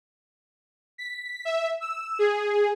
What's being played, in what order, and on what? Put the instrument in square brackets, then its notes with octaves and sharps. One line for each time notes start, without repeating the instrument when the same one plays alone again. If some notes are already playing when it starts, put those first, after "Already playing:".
[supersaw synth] B6
E5
E6
G#4